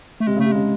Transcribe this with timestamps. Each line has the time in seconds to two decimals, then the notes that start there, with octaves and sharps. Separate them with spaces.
0.20 A3
0.27 C3 G#3
0.36 C#3
0.40 A3
0.46 C3
0.52 C#3 G#3